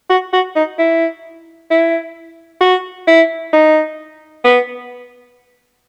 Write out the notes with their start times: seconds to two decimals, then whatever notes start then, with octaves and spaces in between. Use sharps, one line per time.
0.10 F#4
0.33 F#4
0.56 D#4
0.79 E4
1.71 E4
2.61 F#4
3.08 E4
3.53 D#4
4.45 B3